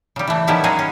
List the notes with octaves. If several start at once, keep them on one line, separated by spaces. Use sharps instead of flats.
C#3 G3
E3 A3
D#3 F3 G3 B3 C#4 E4
F#3 G#3 C#4 F4 G#4 D#5
C#4